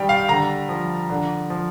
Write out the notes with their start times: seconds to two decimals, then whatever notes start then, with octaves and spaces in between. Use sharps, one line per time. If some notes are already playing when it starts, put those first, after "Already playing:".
Already playing: D#3 G3 G5
0.09 F5
0.29 D3 A#5
0.69 F3
1.10 D3
1.50 F3